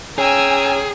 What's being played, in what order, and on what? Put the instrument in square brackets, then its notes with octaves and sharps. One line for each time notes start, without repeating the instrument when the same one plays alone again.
[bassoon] C#4 [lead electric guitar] G#4 [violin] G5 G#5 [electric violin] A#5 E6